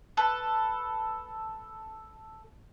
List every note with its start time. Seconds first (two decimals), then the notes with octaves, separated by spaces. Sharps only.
0.17 A4 B4